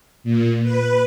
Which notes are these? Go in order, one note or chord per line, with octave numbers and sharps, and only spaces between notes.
A#2
B4